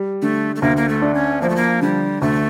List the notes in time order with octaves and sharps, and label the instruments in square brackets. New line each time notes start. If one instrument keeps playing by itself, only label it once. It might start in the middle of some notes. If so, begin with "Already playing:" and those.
Already playing: [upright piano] G3
[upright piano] D3 [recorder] A3
[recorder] A3
[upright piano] D2 [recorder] A#3
[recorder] A#3
A3
[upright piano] D4
[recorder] C#4
[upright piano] F3 [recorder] A#3
[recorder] A3
A#3
[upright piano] D3 [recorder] G3
[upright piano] D2 [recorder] A3